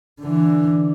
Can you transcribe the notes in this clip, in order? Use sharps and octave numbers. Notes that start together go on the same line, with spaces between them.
D3 E3